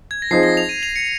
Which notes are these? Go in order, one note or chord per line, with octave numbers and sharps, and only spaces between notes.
G#6
A#6
F3 C4 D#4 G#4 C5 C7
A#6
F7
D#7
F7
C#7